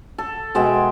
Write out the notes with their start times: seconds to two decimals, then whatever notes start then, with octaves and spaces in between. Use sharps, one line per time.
0.18 A4
0.55 B2 G#3 E5 G5